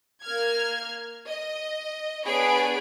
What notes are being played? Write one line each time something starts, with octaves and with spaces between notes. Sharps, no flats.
A#3 F6 G#6
D#5
B3 D4 G#4 C#5 B5 D7